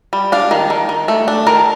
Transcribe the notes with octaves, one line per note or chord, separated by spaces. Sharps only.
G3
D4 F5
D#3
D#3
D#3
A3
D4
D#3 A#4